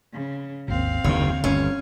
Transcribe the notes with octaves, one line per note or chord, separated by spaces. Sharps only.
C#3
G#1 D#2 C4 F5
F#1 D#2 D3 D#3 C#5
G1 C#4